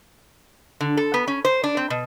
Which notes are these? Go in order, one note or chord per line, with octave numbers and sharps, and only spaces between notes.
D3
A4
B3
C#4
C5
D4
C4
B2